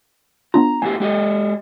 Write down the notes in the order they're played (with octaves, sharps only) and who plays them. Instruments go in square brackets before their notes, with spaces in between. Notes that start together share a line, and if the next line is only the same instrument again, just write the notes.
[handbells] B3 D4 F4 [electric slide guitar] A#5
[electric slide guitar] A2 B3 G4 [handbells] G#5
[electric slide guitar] G#3 G4 D#5